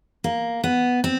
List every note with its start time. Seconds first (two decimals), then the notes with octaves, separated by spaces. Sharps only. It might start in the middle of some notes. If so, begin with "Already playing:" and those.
0.24 A#3
0.64 B3
1.04 C4